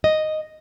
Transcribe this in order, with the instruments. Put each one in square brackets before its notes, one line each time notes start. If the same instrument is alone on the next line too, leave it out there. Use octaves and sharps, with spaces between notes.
[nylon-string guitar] D#5